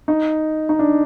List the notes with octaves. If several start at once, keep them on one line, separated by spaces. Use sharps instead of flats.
D#4
D#4
D4